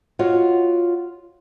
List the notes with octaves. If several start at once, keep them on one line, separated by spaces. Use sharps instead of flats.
F4 F#4 C#5 D#5